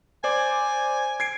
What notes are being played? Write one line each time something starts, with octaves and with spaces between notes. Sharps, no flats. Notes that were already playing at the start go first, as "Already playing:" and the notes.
C5 D5 G#5 D6
G#6 C7 D7